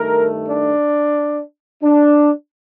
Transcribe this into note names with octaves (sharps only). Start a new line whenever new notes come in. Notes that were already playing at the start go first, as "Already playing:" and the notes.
Already playing: G2 D#3 A3 A#4
D4
D4